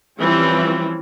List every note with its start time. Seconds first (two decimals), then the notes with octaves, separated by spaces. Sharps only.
0.19 E3 F3 G3 C4 C#4